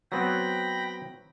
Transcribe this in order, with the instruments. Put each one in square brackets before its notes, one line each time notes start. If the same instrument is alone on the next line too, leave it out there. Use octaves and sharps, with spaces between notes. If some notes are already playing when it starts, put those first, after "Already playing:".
[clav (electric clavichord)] F#3 B3 C4 [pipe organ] G5 B5 A#6